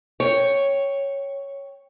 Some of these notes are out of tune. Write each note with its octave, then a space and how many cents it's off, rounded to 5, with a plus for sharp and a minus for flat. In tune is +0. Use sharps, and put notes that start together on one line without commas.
C#5 +0 G5 +0